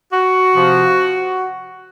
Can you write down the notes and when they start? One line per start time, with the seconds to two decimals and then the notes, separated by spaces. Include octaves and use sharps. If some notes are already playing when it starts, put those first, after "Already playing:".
0.12 F#4
0.54 C3 F3